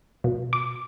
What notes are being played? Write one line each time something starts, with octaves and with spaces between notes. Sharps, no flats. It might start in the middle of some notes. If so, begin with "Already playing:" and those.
B2
D6